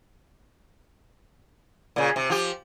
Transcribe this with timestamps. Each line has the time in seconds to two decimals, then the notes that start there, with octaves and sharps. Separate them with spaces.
1.96 A#2 C#3
2.16 C3
2.30 F3 G4